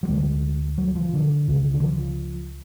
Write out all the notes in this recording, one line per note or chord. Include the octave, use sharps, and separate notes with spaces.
F#3
D2 D3 G#3
F#3
F3
D3
C#2 C#3
D3
F3